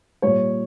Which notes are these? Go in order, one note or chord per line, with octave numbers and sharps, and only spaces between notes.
A#2 G3 C#5